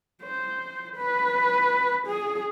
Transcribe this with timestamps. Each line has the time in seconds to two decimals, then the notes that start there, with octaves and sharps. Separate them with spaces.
0.23 C5
0.96 B4
2.07 G#4